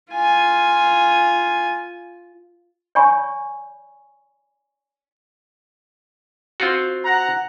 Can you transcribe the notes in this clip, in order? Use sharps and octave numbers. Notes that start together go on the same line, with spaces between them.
F4 G#5
C#5 D5 G#5 B5 C#6
C4 F4 F#4
F#5 A#5